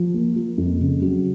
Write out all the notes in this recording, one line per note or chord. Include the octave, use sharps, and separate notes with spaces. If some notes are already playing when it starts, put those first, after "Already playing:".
Already playing: F3
A#3
A#3
F2
C#3
F#3